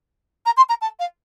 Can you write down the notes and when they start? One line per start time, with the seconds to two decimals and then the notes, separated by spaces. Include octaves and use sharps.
0.46 A#5
0.57 C6
0.69 A#5
0.81 A5
0.99 F5